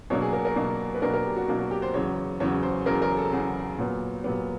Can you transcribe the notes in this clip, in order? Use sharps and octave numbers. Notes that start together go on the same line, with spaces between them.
B2 F#3 A#3 D4 C#5
G#4
A#4
A#4
B2 F#3 A#3 D4
B4
B2 F#3 A#3 D4 A#4
A#4
G4
F#4
B2 F#3 A#3 D4 F#4
F#4
G4
C5
E2 C#3 F#3 C#5
E2 C#3 F#3 C#5
C5
E2 C#3 F#3 A#4
A#4
A4
E2 C#3 F#3 G#4
A#2 F#3 B3
A#2 F#3 B3 G4